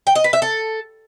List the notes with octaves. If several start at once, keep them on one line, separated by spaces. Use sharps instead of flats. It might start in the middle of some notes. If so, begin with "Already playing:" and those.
G5
D#5
B4
E5
A4